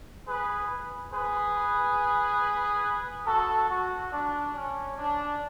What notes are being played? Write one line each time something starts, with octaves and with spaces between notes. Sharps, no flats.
G#4 B4
G#4 B4
F#4 A4
F#4
D4
C#4
D4